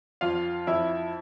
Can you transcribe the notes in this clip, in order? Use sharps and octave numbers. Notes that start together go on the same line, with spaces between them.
F2 F4 F5
F2 E4 E5